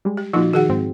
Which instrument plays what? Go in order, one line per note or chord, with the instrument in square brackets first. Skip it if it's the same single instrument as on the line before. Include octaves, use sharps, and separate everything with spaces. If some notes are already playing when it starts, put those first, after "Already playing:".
[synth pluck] G3 G#3
[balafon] G4
[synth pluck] A#2 F4 F#4 [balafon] F3 D#4
[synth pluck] D#3 [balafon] F#4 G#4 F#5
[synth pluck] G#2 C4